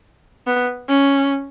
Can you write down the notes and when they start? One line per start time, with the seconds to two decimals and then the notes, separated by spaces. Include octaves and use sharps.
0.47 B3
0.88 C#4